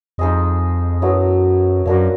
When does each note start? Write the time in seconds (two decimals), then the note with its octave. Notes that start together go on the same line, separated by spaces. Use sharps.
0.18 F2 D#4 G#4 C5 D#5
1.02 F#2 F#3 B3 E4 A4
1.86 F#2 A#3 D4 F#4 A#4